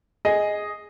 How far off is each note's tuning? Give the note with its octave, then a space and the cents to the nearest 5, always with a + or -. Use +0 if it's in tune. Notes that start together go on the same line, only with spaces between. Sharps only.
G#4 +0 D#5 +0